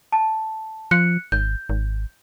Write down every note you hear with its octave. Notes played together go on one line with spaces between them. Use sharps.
A5
F3 F#6 C#7
G#1 G6
G#1